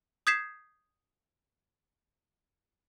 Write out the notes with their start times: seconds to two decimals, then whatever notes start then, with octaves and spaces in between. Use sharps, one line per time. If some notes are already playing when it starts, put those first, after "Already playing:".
0.27 D#6 G6 G#6 B6 C7 E7